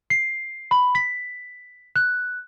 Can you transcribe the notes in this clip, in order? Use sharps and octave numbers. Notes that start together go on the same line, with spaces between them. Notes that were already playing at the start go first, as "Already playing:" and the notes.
C7
B5
B6
F#6